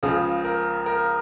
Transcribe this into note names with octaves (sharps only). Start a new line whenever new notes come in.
C#2 C#3 F3 G#4
A#4
A#4